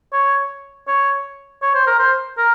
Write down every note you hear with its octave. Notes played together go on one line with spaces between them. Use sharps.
C#5
C#5
C#5
C5
A#4
C5
A#4